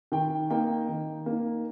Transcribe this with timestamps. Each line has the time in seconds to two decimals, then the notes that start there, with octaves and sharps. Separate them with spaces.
0.12 D#3 G5
0.50 A#3 D#4 G5
0.89 D#3
1.26 A#3
1.31 D#4